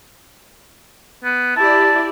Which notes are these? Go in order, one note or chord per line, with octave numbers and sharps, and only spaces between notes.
B3
E4 G4 D5 A5